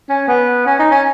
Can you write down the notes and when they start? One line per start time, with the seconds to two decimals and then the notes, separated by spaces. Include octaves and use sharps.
0.09 C#4
0.28 B3
0.66 C#4
0.79 D#4
0.91 C#4